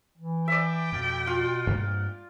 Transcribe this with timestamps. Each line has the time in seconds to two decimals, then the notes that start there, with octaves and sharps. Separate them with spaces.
0.18 E3
0.48 D5 E5 G5
0.92 F2 B2
1.27 F4
1.67 G2 A#3